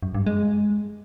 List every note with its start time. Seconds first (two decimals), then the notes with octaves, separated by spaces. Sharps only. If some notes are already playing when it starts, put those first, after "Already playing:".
0.03 F#2
0.15 G2
0.26 G#3